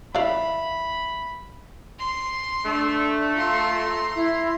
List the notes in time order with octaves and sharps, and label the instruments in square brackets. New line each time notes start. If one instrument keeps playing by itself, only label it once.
[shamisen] E3 D5 F5 [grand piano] E5 [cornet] B5
[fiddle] C6
[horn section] A3 [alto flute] D4
[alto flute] F4 [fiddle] A#5 C6
[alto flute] E4